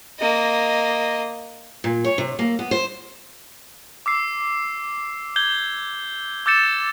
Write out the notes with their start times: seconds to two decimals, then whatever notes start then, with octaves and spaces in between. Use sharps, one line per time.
0.20 A#3 D#5
1.84 A#2
2.04 C#5
2.18 C3
2.39 A#3
2.59 B3
2.71 C5
4.06 D6 E6 C7
5.36 G6 G#6 G7
6.46 D6 E6 G6 A6 C#7 E7